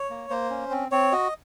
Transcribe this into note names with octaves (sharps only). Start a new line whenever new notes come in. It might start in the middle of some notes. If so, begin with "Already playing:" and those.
Already playing: C#5
A#3
A#3 C5
C#4
C4
C4 C#5
F#4 D#5